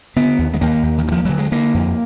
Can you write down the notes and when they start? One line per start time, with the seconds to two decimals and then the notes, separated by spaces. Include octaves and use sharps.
0.16 D3 B3
0.39 D#2
0.53 G#3
0.61 D#2 A#3
0.83 D#2
0.98 D#3
1.06 D2
1.12 F3
1.25 D3 F#3
1.38 G#3
1.52 D3 A#3
1.74 F2